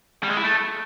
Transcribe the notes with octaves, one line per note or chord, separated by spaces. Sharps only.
G3
G#3
E4
A3